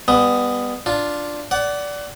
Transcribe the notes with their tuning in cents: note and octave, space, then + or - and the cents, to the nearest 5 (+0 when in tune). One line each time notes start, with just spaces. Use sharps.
G3 +35 B3 +0 D#6 +0
D4 +0 F4 +0
D5 -15 F#5 +25